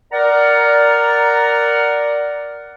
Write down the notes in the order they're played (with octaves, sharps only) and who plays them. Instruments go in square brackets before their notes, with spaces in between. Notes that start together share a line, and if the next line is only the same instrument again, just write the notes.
[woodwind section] A#4 D5 F#5 A#5